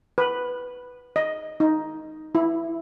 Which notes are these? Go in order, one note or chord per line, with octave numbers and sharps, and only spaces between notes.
B4
D#5
D#4
E4